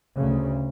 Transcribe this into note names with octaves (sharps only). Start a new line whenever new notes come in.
D2 C#3